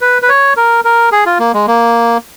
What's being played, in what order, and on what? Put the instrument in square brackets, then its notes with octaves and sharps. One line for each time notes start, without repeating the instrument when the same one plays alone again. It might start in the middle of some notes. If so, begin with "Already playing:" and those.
[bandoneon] B4
B4
C#5
A#4
A#4
G#4
F4
A#3
G#3
A#3